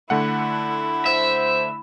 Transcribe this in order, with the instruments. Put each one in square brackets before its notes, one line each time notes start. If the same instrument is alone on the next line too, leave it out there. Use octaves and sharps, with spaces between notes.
[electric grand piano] D3 A3 F#5 [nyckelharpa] E4
[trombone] C5 [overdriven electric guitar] E5